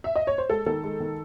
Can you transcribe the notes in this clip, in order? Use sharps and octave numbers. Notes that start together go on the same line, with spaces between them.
E5
D#5
C#5
C5
G#3 A4
D#3 A4
G#3
D#3